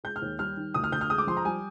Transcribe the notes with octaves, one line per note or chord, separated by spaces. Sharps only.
G#3 G6
F6
D#2
G3 F6
D#3
D2 D#6
F6
D2 G6
F6
G#3 D#6
D6
F3 C6
A#5
G3 G#5